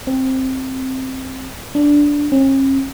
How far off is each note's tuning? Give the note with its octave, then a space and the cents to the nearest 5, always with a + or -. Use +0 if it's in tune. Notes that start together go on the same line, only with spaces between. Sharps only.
C4 +5
D4 -10
C#4 -45